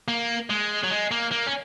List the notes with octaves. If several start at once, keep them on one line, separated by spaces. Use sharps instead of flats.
A#3
G#3
F#3
G#3
A#3
A#3
C#4